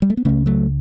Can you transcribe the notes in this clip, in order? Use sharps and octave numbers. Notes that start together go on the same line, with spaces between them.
G3
A3
B3
C#2 C#3 A3 C#4
F#3 A3